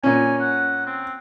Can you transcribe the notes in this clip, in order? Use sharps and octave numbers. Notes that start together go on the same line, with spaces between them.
A#2 C#4 G#5
F#5
C4